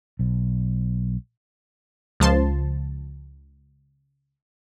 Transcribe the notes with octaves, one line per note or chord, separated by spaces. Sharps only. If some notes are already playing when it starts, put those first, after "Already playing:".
B1
C#2 F3 A5 C6